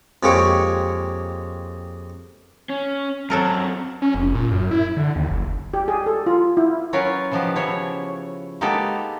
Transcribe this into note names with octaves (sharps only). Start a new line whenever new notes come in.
F2 G#3 A#3 G4 C#5
C#4
F#2 F#3 C4 A4 A#4
C#4
F1
A#2
F#2
E4
D3
D#2
F#1
G4
G#4
A4
F4
E4
F#3 C#4 F4 A#4 B4 C#5
C#3 E3 F3 B3 D#4 G4
C#3 F3 E4 C#5
G#3 A#3 B3 D#4 G4 A4